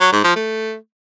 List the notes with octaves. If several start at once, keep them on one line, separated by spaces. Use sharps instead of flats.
F#3
G#2
F3
A3